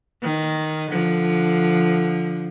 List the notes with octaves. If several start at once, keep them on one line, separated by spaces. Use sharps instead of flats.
D#3
D3 F3